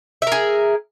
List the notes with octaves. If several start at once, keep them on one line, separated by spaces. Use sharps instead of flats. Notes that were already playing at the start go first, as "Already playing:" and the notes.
G#4 A#4 E5